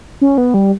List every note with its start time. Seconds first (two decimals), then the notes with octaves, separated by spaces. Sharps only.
0.21 C#4
0.38 B3
0.54 G3